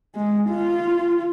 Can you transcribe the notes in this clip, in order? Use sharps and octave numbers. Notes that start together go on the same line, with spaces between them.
G#3
F4